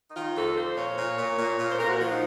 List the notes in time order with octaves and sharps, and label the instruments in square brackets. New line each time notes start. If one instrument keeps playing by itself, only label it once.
[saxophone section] D#4
D#3 F4
F2 A4
F3 C5
A#2 C#5
A#2
A#2
A#2
A#2
C5
A#2 A#4
F4
F#4
F3 F4
D#4